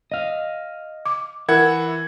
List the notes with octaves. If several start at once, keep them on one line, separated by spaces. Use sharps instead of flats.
D#5 F5
D6
E3 E4 A#4 F#5 G#6